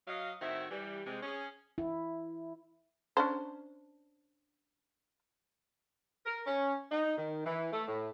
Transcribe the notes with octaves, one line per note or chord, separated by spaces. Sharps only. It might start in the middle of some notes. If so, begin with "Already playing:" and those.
F#3 D#5 F5
A2 D#3 C4 E4 F#4 E5
E3 G3
C3 G#3
C#4 G#4
E4
C#4 D4 C5
A#4
C#4
D#4
D#3
E3
A3
A2